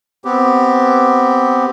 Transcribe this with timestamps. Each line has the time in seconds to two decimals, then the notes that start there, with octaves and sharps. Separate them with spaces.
0.25 B3 C4 G4